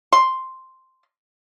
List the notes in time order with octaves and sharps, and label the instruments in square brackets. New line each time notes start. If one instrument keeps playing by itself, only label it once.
[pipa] C6